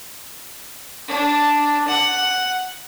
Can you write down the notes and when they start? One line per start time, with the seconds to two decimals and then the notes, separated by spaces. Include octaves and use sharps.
1.08 D4
1.87 F#5